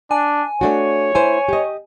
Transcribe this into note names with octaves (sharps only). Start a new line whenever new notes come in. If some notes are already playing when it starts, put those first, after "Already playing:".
D4 G#5
A3 D4 F#4 C#5
E4 B4 C5 G#5
G4 D#5